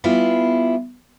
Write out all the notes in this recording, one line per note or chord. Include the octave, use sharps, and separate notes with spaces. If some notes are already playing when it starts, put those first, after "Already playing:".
G3 B3 E4 F4 G#4